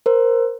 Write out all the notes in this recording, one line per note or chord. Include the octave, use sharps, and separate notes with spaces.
A#4 C5